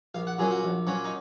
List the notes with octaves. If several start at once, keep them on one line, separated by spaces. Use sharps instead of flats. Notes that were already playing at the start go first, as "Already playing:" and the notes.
A#1 F5
F#5
A#2 F#3 C#4 G#4
F#4
A#1
A#2 F#3 C#4
D#4